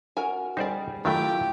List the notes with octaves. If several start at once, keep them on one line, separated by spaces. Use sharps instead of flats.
F#4 A#4 G#5
G3 D#4 G#4 C5 D5
D#3 F#3 A3 E4 F4 G4 E5 G5